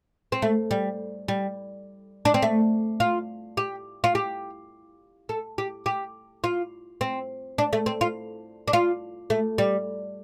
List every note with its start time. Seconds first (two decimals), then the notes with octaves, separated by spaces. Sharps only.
0.32 C4
0.42 A3
0.71 G3
1.28 G3
2.25 D4
2.34 C4
2.42 A3
3.00 F4
3.57 G4
4.04 F4
4.15 G4
5.29 A4
5.58 G4
5.86 G4
6.44 F4
7.01 C4
7.58 D4
7.73 A3
7.86 C4
8.01 F4
8.68 D4
8.73 F4
9.30 A3
9.58 G3